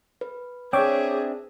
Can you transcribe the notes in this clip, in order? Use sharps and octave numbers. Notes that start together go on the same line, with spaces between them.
B4
C4 D4 G#4 C#5 E5 G5 D6